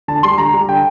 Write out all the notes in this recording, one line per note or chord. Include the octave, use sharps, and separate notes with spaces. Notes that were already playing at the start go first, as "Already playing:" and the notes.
D3 A5
G3 C6
D3 A#5
G3
D3 G5